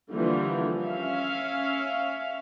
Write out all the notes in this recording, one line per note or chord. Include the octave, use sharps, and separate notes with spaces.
D3 E3 F3 G3 A#3
C#4 E5 F5